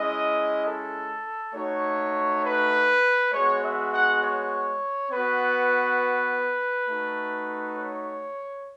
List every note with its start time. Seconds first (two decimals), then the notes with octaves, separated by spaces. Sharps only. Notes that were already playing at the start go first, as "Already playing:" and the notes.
Already playing: G#3 C#4 E4 D#5
0.65 A4
1.54 A3 D#4 F#4 C#5
2.43 B4
3.33 G#3 B3 F#4 C#5
3.62 E5
3.92 F#5
4.21 C#5
5.10 B3 F#4 B4
6.89 A3 D#4 F#4
7.78 C#5